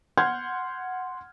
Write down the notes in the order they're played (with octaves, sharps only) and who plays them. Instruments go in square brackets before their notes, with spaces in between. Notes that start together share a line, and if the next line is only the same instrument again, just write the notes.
[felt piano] F#5 C6 F6 G6 G#6